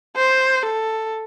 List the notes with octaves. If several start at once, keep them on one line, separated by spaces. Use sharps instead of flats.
C5
A4